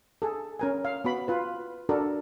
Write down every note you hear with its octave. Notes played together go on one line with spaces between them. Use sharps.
G#4 A4
C#4 A#4 G#5
F5
B3 F#4 B5
F4 B4
D4 F#4 A4 A#4